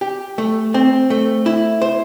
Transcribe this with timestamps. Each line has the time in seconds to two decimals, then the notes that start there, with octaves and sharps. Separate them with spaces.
0.01 G4
0.38 A3
0.74 C4
1.10 A3
1.46 E4
1.82 C5